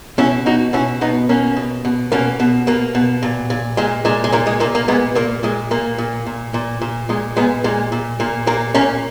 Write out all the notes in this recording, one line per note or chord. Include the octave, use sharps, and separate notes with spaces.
B2 C#4 E4
B2 D#4 F#4
B2 C#4 E4
B2 B3 D#4
B2 A#3 C#4
B2
B2
B2 A#3 C#4
B2
B2 A#3
B2
A#2
A#2
A#2 G#3
A#2 G#3
G#3
A#2 A#3
G#3
A#2 A#3
A#3
A#2 G#3 B3
A#2 A#3
A#2 G#3
A#2 A#3
A#2
A#2
A#2
A#2
A#2 G#3
A#2 G#3 B3
A#2 G#3
A#2
A#2 A#3
A#2 A#3
A#2 A#3 C#4